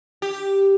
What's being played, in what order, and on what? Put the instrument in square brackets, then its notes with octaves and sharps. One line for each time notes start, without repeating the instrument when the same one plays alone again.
[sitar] G4